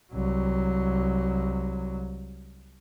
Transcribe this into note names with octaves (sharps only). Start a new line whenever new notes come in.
C2 F#3